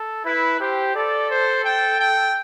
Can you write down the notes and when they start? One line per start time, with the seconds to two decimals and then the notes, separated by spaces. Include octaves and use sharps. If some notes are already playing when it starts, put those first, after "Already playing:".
Already playing: A4
0.25 E4 B4
0.60 G4 C5
0.95 A4 D5
1.30 C5
1.65 G5
2.00 G5